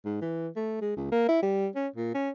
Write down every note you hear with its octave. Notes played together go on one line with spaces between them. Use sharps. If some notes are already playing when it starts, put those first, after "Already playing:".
G#2
E3
A3
G#3
C#2
A#3
E4
G3
C#4
A#2
C#4